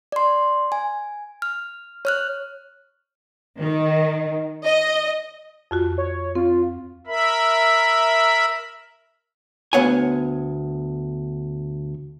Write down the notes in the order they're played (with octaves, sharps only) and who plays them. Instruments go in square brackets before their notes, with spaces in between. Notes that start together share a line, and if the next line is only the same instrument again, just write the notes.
[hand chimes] D5 C6
G#5
F6
C#5 F6 F#6
[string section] D#3
D#5
[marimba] F2 F4 F#4
[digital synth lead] C#5
[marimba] C4 [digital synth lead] F4
[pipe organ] A#4 E5 B5
[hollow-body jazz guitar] D2 B3 C#5 F#5 G#5